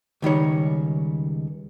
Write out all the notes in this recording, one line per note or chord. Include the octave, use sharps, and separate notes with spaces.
C#2 D#3 G3 C#5